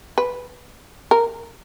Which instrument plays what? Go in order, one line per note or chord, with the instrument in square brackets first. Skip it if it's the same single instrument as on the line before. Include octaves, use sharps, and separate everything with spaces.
[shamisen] B4
A#4